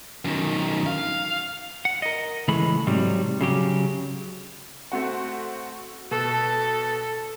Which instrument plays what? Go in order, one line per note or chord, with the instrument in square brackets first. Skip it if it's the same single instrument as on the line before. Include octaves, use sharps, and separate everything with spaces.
[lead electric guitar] F#2 D#3
F5
[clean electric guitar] F#5
A#4 D#5
C#2 E3 G#3 A3 B5
G#2 C3 F#3 G3
C#3 F#3 G4
[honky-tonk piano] A3 C4 F#4
[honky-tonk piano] B2 [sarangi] A4